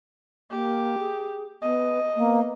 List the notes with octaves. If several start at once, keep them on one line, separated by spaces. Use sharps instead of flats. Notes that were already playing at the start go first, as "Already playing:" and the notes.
A#3 G4
G#4
B3 D#5
A#3 B3